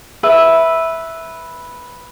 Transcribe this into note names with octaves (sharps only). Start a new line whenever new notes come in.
B4 E5